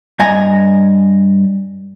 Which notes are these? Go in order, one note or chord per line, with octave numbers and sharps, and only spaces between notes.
G2 D#5 G#5 A#5